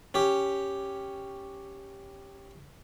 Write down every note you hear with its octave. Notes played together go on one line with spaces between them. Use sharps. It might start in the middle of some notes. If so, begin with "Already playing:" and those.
C#4 G4